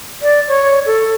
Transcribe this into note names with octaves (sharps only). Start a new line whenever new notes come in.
D5
C#5
A4